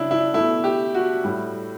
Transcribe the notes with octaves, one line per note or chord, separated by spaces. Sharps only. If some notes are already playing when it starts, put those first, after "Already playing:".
Already playing: C#3 D4 E4
E4
B2 A3 E4
G4
F#4
A2 G3